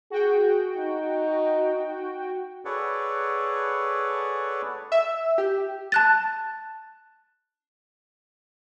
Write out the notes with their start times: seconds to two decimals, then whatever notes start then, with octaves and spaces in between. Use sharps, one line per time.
0.11 F#4 G#4 G5
0.77 D#4
2.65 G#4 A4 B4 C#5 D5 F#5
4.92 E5
5.38 G4
5.92 A5 F#6 A6